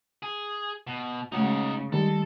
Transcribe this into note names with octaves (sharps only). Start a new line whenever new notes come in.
G#4
B2
C#3 G#3 A3 D#4 F#4 F#5
D#3 G3 G#3 A4